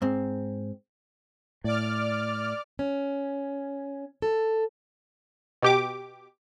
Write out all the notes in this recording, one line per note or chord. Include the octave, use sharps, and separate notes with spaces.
G#2 C4
A2 D5 D6 F6
C#4
A4
B2 G4 D6